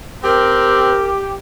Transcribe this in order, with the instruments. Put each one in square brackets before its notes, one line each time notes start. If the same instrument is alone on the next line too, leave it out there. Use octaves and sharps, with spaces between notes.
[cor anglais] C4 [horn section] G4 [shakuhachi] A#4